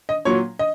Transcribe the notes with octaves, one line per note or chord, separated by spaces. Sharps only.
D#5
A#2 F#3 C#5
D#5